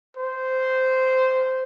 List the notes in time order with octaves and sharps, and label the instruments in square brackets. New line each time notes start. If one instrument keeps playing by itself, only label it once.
[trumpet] C5